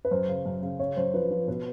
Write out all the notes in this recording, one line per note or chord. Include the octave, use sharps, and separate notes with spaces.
B4
F#2 C5
C#3
F#2
C#3
C#3 C#5
F#2 C5
F3 B4
F3
B2 B4